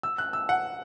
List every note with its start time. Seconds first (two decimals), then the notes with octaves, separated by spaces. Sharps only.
0.03 E6
0.18 F#6
0.33 E6
0.49 F#5